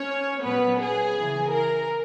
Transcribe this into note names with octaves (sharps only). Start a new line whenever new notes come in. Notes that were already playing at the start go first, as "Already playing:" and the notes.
Already playing: C#4 C#5
A#2 F#3 B3 B4
G#4
C#3 E3
A#4